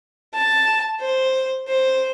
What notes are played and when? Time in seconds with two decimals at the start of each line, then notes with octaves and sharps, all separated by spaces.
0.34 A5
1.01 C5
1.68 C5